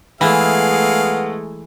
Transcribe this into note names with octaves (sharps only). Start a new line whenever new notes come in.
E3 G#3 A3 B3 G#4 F5